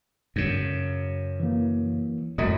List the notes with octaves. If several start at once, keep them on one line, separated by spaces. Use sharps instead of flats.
F#2 C#3
E3 A#3
F#2 A2 F#3 A3 D#6